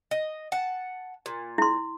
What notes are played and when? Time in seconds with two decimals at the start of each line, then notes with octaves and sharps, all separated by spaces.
0.11 D#5
0.52 F#5 A5
1.26 A#2
1.58 E4 C6